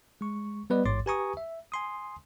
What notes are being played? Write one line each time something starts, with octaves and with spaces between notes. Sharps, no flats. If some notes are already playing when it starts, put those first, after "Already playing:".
G#3 C#6
G3 B3 B4 D5 D#5
A1 G#2 C#5 C6 D6 A6
G4 B4 G#5 A#5 C#6 D#6
E5
G#5 C6 D#6